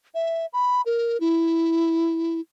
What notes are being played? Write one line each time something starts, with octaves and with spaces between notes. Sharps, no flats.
E5
B5
A#4
E4